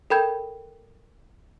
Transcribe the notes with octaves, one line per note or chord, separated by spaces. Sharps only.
A4 A#4 G5 B5 G6 G#6